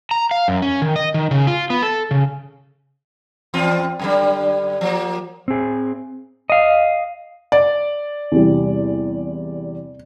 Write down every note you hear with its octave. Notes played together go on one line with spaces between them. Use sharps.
A#5
F5
F#2
C#4
D#3
D#5
D#3
C#3
F4
B3
A4
C#3
E2 C4 F4
F#2 D3 G3
F3 A#3
C4 G#4
D#5 F5
D5
E2 C3 G3